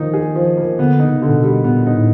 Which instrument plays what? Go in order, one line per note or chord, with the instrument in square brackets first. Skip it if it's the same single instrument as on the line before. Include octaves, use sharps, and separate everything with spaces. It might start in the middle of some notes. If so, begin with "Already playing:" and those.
Already playing: [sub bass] D#3 [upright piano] F3 A#3 D#4
[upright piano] G#4
F3
A#3
[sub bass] D3 [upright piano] B3
[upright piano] D#4
[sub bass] C#3
[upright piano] D3
[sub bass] A#2
B2
[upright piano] G3
[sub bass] A#2 [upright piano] B3
[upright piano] D#4
[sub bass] A2